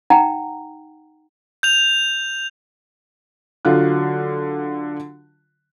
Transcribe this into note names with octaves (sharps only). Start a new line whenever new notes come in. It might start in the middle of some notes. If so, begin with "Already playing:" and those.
D#4 F#5 G5 A#5
G6 F7
D3 F#3 F4 F#6